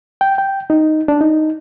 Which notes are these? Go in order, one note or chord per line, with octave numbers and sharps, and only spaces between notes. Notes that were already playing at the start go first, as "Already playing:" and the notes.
G5
G5
D#4
D4
D#4